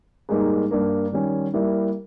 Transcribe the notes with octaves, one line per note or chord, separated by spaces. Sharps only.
G#2 G3 A#3 D#4
G2 G3 A#3
D#3 G3 C#4
G3 A#3 E4 A#4